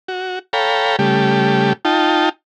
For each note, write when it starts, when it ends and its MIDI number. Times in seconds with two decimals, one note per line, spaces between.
0.08 0.39 66
0.53 0.96 69
0.53 0.96 73
0.53 0.96 77
0.53 0.96 79
0.53 0.96 82
0.53 0.96 83
0.99 1.73 49
0.99 1.73 55
0.99 1.73 57
0.99 1.73 67
1.85 2.29 63
1.85 2.29 65
1.85 2.29 79
1.85 2.29 81